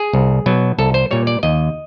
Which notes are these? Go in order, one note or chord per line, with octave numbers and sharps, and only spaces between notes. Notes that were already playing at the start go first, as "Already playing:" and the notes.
Already playing: G#4
C2
B2 F#3
C2 A4
C5
A#2 G3 C#5
D5
D#2 D#5